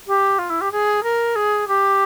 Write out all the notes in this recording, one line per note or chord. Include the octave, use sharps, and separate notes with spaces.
G4
F4
E4
G4
G#4
A#4
G#4
G4